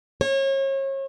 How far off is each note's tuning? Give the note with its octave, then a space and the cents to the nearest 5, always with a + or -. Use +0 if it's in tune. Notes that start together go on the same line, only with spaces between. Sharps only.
C#5 -35